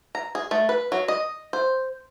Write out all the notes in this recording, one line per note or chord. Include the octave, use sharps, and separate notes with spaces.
A#5
G#4
A3
B4
F#3
D#5
C5